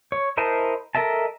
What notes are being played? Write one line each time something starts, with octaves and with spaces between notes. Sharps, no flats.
C#5
E4 A#4 C5 D#5 A5
A4 A#4 D#5 E5 A5